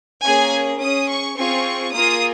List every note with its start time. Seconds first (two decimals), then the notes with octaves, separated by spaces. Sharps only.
0.24 A#3 C#4 G#4 G#5
0.80 C#4 G#4 D#6
1.09 C#6
1.36 C4 F4 G#4 C#6
1.92 A#3 F4 G#4 D#6